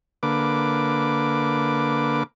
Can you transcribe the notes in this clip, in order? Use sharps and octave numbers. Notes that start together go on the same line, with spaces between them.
D3 A#3 B4 D6